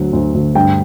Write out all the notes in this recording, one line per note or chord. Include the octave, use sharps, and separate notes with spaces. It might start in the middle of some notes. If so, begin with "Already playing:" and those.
Already playing: D2 F#3
D2
D2
G2 G5